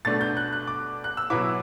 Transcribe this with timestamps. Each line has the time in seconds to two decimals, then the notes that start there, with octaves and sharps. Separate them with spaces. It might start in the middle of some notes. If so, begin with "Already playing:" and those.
0.05 B2 A3 D4 A6
0.21 G6
0.37 F#6
0.53 F#6
0.67 D6
1.04 F#6
1.17 E6
1.30 B2 F#3 B3 E4 D6